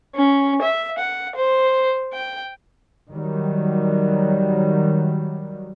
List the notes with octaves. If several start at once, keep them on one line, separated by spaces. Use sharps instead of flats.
C#4
E5
F#5
C5
G5
D#3 F#3 G3